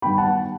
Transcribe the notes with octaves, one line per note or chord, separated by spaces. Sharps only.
G2 D#3 G3 B3 G5 B5
F#5 A5